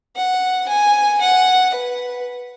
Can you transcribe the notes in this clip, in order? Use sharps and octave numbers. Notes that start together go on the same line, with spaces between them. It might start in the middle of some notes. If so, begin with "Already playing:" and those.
F#5
G#5
F#5
B4